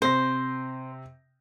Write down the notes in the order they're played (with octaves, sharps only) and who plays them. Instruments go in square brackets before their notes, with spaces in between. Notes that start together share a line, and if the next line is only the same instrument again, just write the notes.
[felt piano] C3 A#6 [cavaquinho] C5